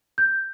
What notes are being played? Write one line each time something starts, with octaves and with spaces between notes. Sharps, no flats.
G6